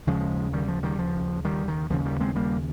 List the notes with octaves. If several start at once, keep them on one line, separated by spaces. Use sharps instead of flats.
D#2 C#3 F3 G#3
D#3 G3
F3
D#3 G3
F3
D#3 G3
D#3
D#2 C#3 F3
D#3 G3
G#3 C4
G3 A#3